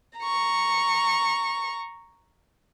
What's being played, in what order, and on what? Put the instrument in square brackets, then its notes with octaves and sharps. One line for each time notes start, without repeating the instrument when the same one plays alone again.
[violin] A#5 C#6